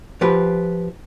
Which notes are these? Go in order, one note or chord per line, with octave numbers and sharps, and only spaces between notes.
F3 G4 B4